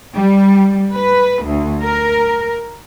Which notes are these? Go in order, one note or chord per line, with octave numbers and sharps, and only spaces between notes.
G3
B4
D2
A#4